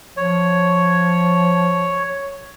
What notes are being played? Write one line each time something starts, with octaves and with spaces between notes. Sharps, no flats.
F3 C#5